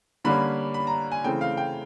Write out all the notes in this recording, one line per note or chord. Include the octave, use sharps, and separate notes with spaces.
D3 G3 A#3 C#4 B5
B5
A#5
G#5
C#3 E3 A3 C4 G5
F5
G5